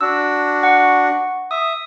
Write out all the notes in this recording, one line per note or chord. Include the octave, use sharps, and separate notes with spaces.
D4 F#4 E6
F#5 C#6
E5 D#6